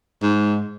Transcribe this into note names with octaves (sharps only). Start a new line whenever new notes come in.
G#2